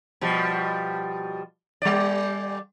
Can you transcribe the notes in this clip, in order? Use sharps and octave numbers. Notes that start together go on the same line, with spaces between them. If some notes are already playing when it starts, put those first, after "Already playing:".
B2 F3 G3
G3 D5